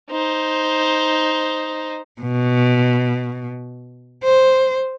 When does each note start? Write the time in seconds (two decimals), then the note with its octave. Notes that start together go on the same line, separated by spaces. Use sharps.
0.11 D#4 C5
2.22 B2
4.24 C5